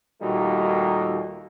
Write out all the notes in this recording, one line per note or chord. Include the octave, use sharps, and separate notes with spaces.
D#2 A#2 G3 A3 D#4 F#4